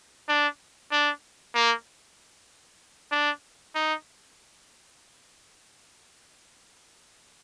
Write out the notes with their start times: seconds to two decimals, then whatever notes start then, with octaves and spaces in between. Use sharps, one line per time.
0.29 D4
0.91 D4
1.54 A#3
3.12 D4
3.75 D#4